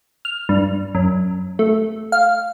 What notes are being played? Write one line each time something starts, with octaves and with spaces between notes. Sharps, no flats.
F6
G2
F#2
A3
F5